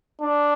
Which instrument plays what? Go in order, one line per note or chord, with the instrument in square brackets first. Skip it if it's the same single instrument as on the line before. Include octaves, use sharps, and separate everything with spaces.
[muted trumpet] D4